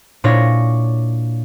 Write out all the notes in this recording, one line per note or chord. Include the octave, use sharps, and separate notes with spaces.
A#2 D4 E4 C#5 A#6